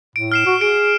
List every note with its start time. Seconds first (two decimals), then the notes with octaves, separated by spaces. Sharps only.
0.16 A2 D7
0.32 F6 C7 E7
0.46 F#4
0.61 G#4 D7